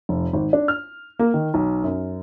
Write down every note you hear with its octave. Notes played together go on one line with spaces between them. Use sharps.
F1
G#1
D4
F6
A#3
D#3
B1
F#2